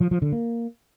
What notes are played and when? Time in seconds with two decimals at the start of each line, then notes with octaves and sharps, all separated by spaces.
0.01 F3
0.11 F3
0.22 D3
0.32 A#3